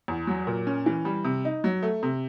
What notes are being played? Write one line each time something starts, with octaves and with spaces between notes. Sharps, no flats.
E2
F#3
A#2
C#4
E3
G3
C3
D#4
F#3
A3
C3